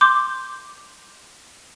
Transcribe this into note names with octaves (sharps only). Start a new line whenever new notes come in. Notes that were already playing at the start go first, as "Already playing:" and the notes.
C6 D6 G6